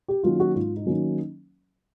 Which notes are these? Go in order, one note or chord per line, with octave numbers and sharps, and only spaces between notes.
G4
D#3 F#3 A#3 C#4 F4
F#4
G#2 F4
D#4
D#3 F#3 A#3 C#4